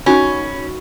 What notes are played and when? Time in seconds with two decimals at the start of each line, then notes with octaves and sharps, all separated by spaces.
0.06 C#4 D#4 F#4 B5